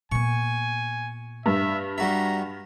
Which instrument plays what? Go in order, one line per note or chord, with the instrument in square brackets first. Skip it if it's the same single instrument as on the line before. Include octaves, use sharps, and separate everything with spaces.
[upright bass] A#2 B3 [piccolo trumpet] G#5 [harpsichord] C#6
[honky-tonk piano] G2 [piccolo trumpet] E5
[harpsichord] G3 F#4 E5 [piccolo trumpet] A#5